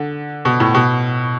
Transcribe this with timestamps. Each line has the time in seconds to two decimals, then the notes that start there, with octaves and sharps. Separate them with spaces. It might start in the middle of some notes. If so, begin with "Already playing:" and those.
Already playing: D3
0.45 B2
0.60 A2
0.74 B2